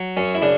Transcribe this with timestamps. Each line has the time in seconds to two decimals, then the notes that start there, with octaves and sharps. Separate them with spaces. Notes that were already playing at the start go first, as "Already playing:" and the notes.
Already playing: F#3
0.17 F#2 C#4
0.35 E4
0.42 C#3 D4